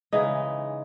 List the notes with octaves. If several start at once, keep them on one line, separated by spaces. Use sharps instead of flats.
C#3 E3 G#3 D#4